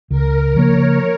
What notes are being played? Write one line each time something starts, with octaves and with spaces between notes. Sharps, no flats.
C#2 A#4
C#3 F3 A#3 C#5